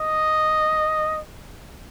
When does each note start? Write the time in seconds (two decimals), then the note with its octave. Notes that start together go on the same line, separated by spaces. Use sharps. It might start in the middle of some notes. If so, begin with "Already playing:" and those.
Already playing: D#5